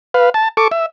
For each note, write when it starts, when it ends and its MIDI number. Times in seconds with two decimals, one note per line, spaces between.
0.14 0.30 71
0.14 0.30 77
0.34 0.48 81
0.57 0.68 69
0.57 0.68 85
0.57 0.68 86
0.71 0.86 76